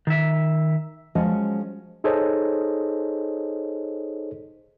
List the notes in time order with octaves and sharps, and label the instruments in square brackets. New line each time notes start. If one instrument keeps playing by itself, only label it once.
[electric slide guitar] D#3 E5
[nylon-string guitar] F3 F#3 G#3 C#4 D#5
[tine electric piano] D#4 G#4 A4 C5 C#5 D#5